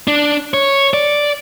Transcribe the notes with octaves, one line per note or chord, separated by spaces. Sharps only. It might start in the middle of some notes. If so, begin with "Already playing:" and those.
D4
C#5
D5